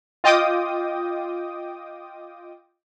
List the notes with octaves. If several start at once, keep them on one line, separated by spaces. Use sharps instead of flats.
F4 D#5 G5 D6 D#6